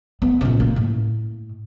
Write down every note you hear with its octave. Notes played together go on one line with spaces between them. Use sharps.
B3
A#2 C#3
A#3
A2